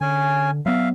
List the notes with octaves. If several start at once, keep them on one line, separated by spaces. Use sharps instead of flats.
D3 C#4 G#5
F#3 B3 E5 F5